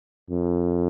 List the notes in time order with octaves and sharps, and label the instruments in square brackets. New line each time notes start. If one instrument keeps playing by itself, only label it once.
[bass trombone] F2